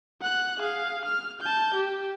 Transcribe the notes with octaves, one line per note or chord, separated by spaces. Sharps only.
F#5 F#6
G#4 F5
F6
A5 G6
G4